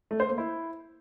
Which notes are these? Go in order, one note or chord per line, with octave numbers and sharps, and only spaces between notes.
A3
C5
A#3
E4